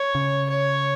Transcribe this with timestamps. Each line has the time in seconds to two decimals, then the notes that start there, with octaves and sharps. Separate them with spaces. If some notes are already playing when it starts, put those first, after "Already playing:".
Already playing: C#5
0.15 C#3
0.50 C#5